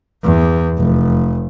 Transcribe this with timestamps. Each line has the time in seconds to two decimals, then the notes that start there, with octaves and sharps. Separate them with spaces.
0.23 E2
0.78 F1